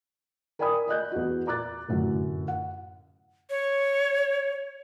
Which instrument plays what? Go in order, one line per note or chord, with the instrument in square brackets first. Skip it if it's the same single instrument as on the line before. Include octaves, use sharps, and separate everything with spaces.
[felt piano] A#4 D5 G5 G#5 B5 D#6
D5 D#5 F#6 G6
E2 F#4
D5 A#5 D6 F#6 A6
F1 F#2 A2 D3
F#5
[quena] C#5